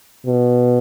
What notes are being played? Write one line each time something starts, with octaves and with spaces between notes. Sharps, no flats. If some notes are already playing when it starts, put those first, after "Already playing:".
B2